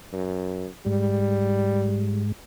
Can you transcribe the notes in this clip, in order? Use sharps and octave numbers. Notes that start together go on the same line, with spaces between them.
F#2
G#2 G3